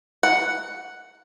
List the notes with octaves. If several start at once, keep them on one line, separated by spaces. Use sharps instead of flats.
F#5